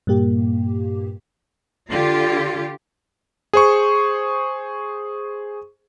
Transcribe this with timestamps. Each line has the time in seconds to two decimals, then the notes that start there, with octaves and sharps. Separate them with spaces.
0.07 G2 A#2 A#3 G4
1.88 D3 F4 G4
3.53 G#4 C5 C#6